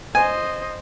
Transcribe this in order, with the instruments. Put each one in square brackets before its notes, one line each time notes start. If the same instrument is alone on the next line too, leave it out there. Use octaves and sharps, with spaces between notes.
[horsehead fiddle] C5 D#5 [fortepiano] G#5